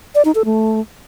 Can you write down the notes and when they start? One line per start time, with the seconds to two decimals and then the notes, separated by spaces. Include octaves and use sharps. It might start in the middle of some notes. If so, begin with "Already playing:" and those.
0.15 D5
0.25 D#4
0.35 A4
0.45 A3